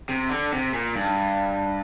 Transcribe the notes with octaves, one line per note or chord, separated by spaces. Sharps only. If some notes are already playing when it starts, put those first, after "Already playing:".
C3
D3
C3
A#2
G2